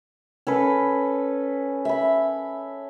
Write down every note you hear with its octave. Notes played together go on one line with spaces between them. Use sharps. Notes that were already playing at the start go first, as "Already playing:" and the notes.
C#4 A4 B4
E5 B5